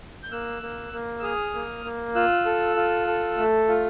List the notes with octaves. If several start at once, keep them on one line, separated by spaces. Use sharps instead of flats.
G6
A#3 E6 F#6
A#3
A#3
E6
G#4 D#6 F6
A#3
A#3
F4 E6 F#6
A4
F4
A4
A3
F4